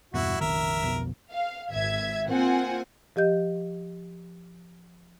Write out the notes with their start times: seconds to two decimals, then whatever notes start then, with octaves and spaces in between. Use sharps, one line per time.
0.14 E2 G2 B2 E4 F#4
0.41 F1 A#1 D#3 A#4 E5
0.82 B1 F2 B2
1.32 F5
1.69 G#1 E5 G#6
2.28 A#3 C4 F4 F#5 G#5
3.16 F3 G4 D#5 G6